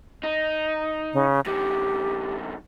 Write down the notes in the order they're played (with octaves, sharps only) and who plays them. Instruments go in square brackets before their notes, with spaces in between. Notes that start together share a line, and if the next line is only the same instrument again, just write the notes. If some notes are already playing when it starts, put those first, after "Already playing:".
[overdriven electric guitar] D#4
[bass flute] C#3
[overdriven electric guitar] G2 D#3 [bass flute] G4